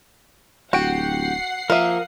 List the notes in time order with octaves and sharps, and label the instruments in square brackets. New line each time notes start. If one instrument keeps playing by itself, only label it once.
[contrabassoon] D1 [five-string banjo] F#4 [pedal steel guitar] G4 G5 [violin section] F#5 C7
[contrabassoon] F3 [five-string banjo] A#3 E5 [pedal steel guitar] A#4 F5 D#6